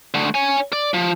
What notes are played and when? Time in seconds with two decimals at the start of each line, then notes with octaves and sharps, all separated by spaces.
0.14 D3 A3
0.35 C#5 G#5
0.73 D5
0.94 F3